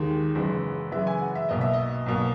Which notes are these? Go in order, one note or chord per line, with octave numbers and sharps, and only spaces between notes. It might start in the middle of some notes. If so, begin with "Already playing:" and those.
Already playing: D#2 D#3 G#3
F#1 F#2 E3 G#3
F#1 F#2 E3 G#3 E5
G#5
F#5
E5
B1 B2 A#3 D#5
E5
D#5
B1 B2 A#3